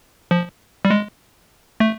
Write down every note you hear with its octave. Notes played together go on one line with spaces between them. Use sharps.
F3
G3
G#3
A3